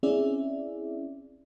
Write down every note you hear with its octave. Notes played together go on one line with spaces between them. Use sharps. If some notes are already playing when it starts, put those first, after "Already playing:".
C4 C#4 E4 G#4 D5 E5